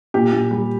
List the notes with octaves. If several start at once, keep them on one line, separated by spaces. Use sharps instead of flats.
A#2 G4
A#2
G3